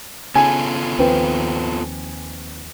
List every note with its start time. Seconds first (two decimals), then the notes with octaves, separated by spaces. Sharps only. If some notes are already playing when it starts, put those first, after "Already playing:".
0.35 C#3 B3 F4 A4 G#5
0.99 D#2 F3 C4 B4 G5